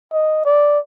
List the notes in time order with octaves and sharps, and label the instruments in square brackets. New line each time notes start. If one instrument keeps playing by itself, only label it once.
[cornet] D#5
D5